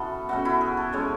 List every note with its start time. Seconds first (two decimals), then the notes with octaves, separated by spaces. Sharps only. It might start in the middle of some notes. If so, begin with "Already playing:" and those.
Already playing: B2 E3 B3 C#4 A4
0.29 B2 A3 C#4 F#4
0.45 E4
0.61 G#4
0.77 A4
0.93 A2 G#3 C#4 C#5